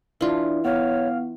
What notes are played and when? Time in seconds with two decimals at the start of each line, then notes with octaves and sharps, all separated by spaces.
0.21 E3 D4 F4
0.65 B3 C#5 F5